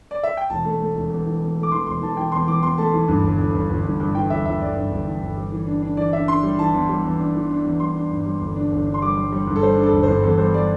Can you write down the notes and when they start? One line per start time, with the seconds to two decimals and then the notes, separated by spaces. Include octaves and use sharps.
0.11 D5
0.23 E5
0.37 G5
0.50 E1 A5
0.65 A3
0.80 A3
0.96 E1
1.11 E2
1.26 E3
1.41 E2
1.57 A3
1.63 D6
1.72 E3 C6
1.87 E1 C6
2.02 E3 A5
2.17 E3 G5
2.32 E2 C6
2.48 E3 D6
2.63 E2 C6
2.78 A3 A5
2.94 E3
3.08 G2
3.23 G1
3.39 G1
3.54 G1
3.69 G1
3.85 G2
4.00 G2
4.15 E3 G5
4.30 G1 E5
4.46 G1 E5
4.61 G1 D5
4.76 G2
4.91 G1
5.07 E3
5.22 G1
5.37 G3
5.52 E3
5.67 D4
5.82 D4
5.97 E3 D5
6.13 D4 E5
6.28 D4 C6
6.43 G3
6.58 E3 A5
6.74 E2
6.89 G3
7.04 E2
7.19 D4
7.35 E3
7.50 D4
7.65 E2
7.80 G3 C6
7.95 D4
8.11 G2
8.26 G3
8.41 G1
8.56 D4
8.72 G1
8.87 D4
8.94 C6
9.02 G3 D6
9.17 G3
9.32 G3
9.47 G2
9.56 A4
9.62 G3 C5
9.77 D4
9.83 A4
9.93 G1
10.03 G2 C5
10.23 E2 A4
10.38 G3 C5
10.54 G3 D5